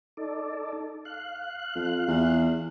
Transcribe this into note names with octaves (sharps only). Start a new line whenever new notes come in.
D#4 A4 D5
F5 F#6
F2
E2